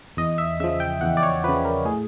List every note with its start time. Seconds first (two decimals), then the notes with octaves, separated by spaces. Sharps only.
0.17 E2 D#5
0.38 E5
0.60 C#3 F3 E5
0.80 G5
1.01 E2 F#5
1.17 D5
1.23 C#5
1.44 C#3 F3 B4
1.65 A#4
1.85 A2 G#4